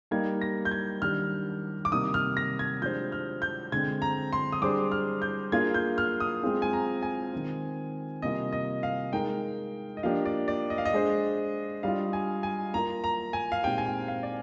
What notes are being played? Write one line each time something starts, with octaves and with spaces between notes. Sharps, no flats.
G3 A#3 D#4 G4 G#6
A#6
G6
G#6
D#3 G3 D4 G4 F6
D6
C3 D#3 G3 A#3 D#4 D#6
F6
A#6
G#6
F3 G#3 D4 G4 C5 G6
F6
G6
D3 G#3 C4 G#6
A#5
C6
D#6
G3 D4 G#4 C5 D6
F6
G6
A#3 D4 F4 G#4 G#6
G6
F6
D#6
G#3 C4 F4 G#4
G#5
A#5
G#5
D#3 G#3 C4
C3 G3 A#3 F4 D#5
D#5
F5
G#3 D#4 A#4 G5
D#5
F3 A#3 D4 G4 F5
D5
D5
D#5
F5
D#5
G#3 D4 G#4 C5
G3 D4 F4 F5
G#5
G#5
A#3 F4 A#4 A#5
A#5
G#5
F5
A#2 G#3 C4 D#4 G4 G5
G#5
G5
F5
D5